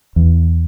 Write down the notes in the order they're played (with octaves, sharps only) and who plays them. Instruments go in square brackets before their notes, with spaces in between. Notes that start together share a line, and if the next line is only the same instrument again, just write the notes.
[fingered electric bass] E2